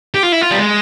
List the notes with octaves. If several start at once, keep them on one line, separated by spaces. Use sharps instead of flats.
G4
F4
E4
F4
G3
G#3